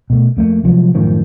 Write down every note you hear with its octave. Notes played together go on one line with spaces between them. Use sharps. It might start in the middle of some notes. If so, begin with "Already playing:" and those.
B2 A3
F2 A3 A#3
C3 F3 F#3 G#3
F#2 A2 D#3 F3